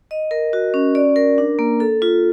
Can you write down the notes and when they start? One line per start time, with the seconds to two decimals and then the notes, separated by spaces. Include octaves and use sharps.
0.11 D#5
0.31 A#4
0.53 F#4
0.74 C#4
0.95 D5
1.16 A#4
1.38 D4
1.59 A#3
1.80 A4
2.02 F4